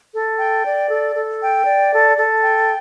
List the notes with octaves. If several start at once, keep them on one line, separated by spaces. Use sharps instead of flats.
A4
G5
D5
A4
A4
G5
D5
A4
A4
G5